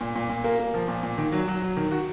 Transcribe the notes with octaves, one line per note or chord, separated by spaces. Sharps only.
A#2
A#2
A#2
A#3
A#3
F3
A#2
A#2
D#3
F#3
F#3
F#3
D#3
F#4